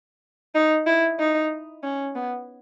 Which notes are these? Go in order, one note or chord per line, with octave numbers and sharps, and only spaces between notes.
D#4
E4
D#4
C#4
B3